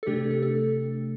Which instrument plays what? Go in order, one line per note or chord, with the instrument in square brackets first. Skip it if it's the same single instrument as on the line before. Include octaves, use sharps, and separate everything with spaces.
[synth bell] A4
[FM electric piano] C3 A3 D4 [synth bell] G4
[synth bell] A4
A4